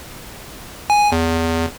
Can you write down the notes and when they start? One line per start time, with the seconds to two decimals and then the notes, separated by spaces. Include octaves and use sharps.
0.90 G#5
1.12 E2